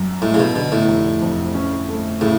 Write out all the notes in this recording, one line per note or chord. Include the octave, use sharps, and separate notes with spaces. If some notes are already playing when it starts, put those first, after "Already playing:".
Already playing: F#2
A2 G#3
C#3
B2
B2 D3
A2
F1
F2
C#4
A3
A2 C#3